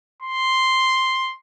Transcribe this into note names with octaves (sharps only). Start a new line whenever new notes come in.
C6